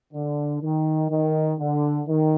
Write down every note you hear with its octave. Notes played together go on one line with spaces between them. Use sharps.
D3
D#3
D#3
D3
D#3